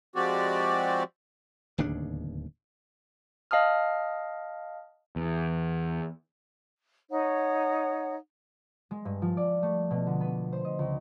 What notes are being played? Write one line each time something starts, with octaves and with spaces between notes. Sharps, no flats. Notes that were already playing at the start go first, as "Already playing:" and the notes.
F3 G#3 C4 F#4 G4 D5
D1 D#2 C#3 D4
D#5 F5 A5 D#6 F6
E2
D#4 C#5 F#5
G#3
G2
F3
D5
A3
B2
D3
B3
C5
D#5
C#2